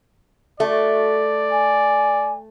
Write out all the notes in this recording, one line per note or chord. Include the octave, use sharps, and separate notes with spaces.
A3 F#4 D5
G#5